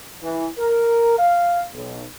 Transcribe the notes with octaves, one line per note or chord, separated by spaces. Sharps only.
E3
A#4
F5
B1